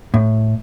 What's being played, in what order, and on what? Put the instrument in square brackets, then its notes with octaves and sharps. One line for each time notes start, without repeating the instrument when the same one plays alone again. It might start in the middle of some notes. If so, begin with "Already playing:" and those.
[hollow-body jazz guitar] A2